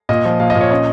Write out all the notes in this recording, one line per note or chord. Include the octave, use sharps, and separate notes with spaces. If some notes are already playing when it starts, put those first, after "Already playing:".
A#2 D#5
F3
A#2 F5
D#5
A#2
C#5
C#4 D#5